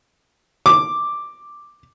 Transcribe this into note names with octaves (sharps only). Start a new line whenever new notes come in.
D6